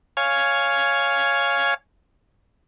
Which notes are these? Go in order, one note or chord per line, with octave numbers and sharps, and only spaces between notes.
C#5 F5 G#5